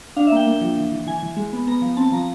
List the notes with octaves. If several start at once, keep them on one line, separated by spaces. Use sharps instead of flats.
D4 F5
E5
A#3 G5
A#3
F3
E3
E3
E3 G#5
E3
G#3
B3
B3 A#5
F3
C4 A5
F3 A#5